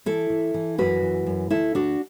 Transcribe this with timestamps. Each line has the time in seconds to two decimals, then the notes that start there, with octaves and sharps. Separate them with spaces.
0.06 E3 E4 A4
0.30 E3
0.54 E3
0.78 F#2 F#4 B4
1.02 E3
1.26 F#2
1.50 D2 E4 A4
1.75 D2 D4 F#4